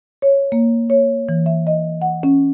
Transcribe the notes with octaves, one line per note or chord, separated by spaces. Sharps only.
C#5
A#3
C#5
E3
E5
D#5
F#5
C#4